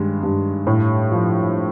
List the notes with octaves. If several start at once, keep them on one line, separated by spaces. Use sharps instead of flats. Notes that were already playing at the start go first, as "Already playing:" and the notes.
Already playing: G2 D#3 G#3
G2
A2
F3